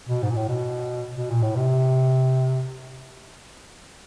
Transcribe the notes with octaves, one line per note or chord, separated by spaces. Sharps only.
B2
G#2
A#2
A2
B2
B2
A#2
A2
C3